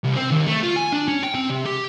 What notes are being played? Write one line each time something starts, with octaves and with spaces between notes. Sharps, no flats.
C2
C4
D#2
A3
F4
G#5
D4
C#4
G5
C4
C3
G4